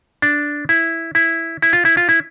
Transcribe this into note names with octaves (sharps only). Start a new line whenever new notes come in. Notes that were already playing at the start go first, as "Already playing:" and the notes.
D4
E4
E4
E4
F4
E4
F4
E4